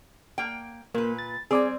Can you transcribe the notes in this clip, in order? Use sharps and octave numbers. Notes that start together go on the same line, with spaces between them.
A#3 G5
A#2 A#3 B4
A6
G3 C4 G#4 D5 G#5